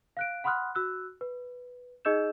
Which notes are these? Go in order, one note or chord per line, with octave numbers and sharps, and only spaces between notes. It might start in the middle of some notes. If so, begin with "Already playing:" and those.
F5 F#6 D7
F#5 B5 C6 D#6 F6 F#6
F#4 E6 F#6
B4
D#4 G#4 D#5 E6 G6 E7